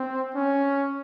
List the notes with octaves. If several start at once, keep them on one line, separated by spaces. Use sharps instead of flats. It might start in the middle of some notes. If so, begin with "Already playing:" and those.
Already playing: C4
C#4